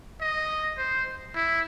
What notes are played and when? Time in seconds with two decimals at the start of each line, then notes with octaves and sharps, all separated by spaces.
0.21 D#5
0.78 C5
1.35 E4